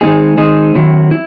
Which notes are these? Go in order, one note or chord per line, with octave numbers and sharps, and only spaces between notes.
D#3 G#3 C4 D#4 G#4
D#3 G#3 C4 D#4 G#4
D#3 F#3 C4 E4
E4